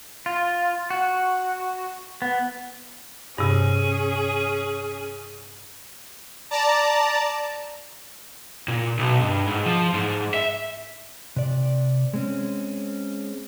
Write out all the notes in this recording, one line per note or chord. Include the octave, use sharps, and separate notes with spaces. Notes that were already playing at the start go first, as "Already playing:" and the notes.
F4
F#4
B3
G2 C3 C#4 G#4
D5 A5 A#5
A#2
B1
G2
G#2
F3
G#2
E5
C3 D5
G#3 C4 C#4